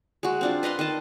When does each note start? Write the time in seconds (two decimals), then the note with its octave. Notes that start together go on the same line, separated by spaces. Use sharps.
0.23 G#3 F#4
0.41 C4 D4 F4
0.63 B4 D#5 F5 C6
0.79 D#3 D#5 A5